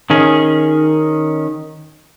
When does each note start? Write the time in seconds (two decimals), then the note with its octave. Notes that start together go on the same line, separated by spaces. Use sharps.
0.10 D#3 C#4 G#4